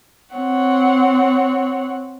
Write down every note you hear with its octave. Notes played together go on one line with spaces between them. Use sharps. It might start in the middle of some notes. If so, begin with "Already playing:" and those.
C4 C#5 F#5